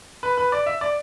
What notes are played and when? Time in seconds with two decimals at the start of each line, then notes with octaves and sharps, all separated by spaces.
0.23 B4
0.38 B4
0.52 D5
0.66 E5
0.81 D5